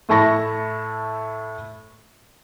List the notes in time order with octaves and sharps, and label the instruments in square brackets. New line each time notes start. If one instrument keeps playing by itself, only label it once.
[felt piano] A2 A3 E4 A5 C#6 A#6